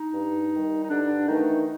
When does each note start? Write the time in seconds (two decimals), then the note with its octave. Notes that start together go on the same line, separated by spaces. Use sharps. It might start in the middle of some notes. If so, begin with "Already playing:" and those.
Already playing: D#4
0.13 G2
0.52 D#3 G3
0.84 D#4
0.89 G2 D3 D4
1.27 D#3 E3 A3 D#4